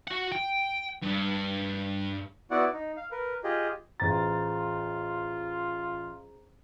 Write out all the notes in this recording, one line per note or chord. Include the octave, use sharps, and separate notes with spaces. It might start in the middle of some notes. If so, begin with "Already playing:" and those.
F#4 F#5
G5
G2
B3 E4 F#4 D5 F#5
D#4
F5
A#4 B4
F4 G4 G#4 D#5
A1 F4 G#4 C5 A#5 A6